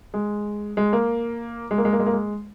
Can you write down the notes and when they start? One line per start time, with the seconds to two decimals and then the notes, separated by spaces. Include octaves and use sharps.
0.14 G#3
0.77 G#3
0.93 A#3
1.71 G#3
1.78 A#3
1.85 G#3
1.93 A#3
2.00 G#3
2.06 A#3
2.13 G#3